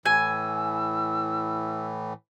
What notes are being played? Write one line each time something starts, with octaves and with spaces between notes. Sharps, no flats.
A2 E3 G#5 E6